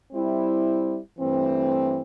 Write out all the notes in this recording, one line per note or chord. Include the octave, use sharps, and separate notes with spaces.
G3 C4 E4
G2 E3 A3 C4